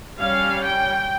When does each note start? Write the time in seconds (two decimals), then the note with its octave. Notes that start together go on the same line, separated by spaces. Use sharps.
0.18 G3 C#4 F5
0.64 G5